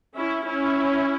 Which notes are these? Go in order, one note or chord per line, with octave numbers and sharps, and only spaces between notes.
C#4 E4
C#4 E4